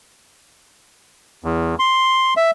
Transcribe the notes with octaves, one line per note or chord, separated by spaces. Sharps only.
E2
C6
E5